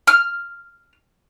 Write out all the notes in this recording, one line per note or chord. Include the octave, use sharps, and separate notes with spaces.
F6